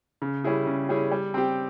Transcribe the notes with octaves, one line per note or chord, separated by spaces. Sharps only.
C#3
G3 C#4 E4 G#4
C#3
G3 C#4 E4 G#4
G3
C4 G4